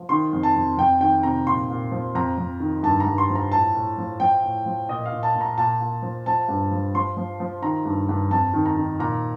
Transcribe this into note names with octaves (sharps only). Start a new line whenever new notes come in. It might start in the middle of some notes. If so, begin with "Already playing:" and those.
Already playing: F3
D#3 C6
F2
A5
F2
F2 G5
D#3 G5
C3 A#5
A#2 C6
A#2
F3
F2 A#5
F2
D#3
G2 A5
A#5
G2
C6
F3
A#5
A2 A5
A2
F3
F3 G5
A2
F3
A#2 D#5
F5
A#2
A5
A#2
A#5
A#2 A5
A#2
F3
F3 A5
G2
F3
F3 C6
F3
F3
D#3 A#5
G2
G2
F2 A5
D#3
A#5
D#3
A#2 A#5